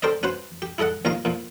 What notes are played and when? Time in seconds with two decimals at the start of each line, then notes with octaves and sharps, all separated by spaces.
0.02 G4 A4 A#4 C5 D5 D#5
0.23 C#4 F#4 B4 C5
0.62 G4
0.78 E4 G#4 A4 D#5 F#5
1.05 D#2 A#2 F3 D#5 F5 A#5
1.25 A#2 F3